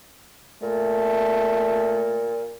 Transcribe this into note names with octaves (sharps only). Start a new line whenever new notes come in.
A#2 A3